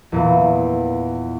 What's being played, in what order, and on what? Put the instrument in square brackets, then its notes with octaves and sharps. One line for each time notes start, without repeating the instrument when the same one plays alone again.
[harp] E2 A#2 E3